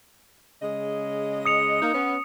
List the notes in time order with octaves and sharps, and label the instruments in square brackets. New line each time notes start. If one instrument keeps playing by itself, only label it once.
[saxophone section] C#3 G#3 D#5
[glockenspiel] D#6 C#7 F7
[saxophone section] A#3 D#4
B3 C#4